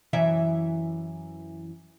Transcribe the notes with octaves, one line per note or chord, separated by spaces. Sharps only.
F#2 E3 E5